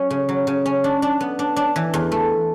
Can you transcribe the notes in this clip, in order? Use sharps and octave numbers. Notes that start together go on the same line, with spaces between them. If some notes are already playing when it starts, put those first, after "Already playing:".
Already playing: F#3 C#4
C#3
F#3
C#3
C#4
D4
D4
B3
D4
D4
E3
E2
A3